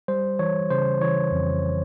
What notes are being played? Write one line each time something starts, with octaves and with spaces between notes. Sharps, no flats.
G3 C5
E3 C#5
C#3 C5
E3 C#5
F2